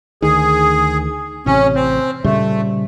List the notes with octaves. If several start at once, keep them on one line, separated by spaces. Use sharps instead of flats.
D2 D#3 G#4
A1 C3 C#4
C4
A#2 C#3 G3 A3